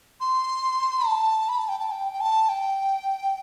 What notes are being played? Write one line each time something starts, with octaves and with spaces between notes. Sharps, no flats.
C6
A5
B5
A5
G5
A5
G5
G5
A5
G5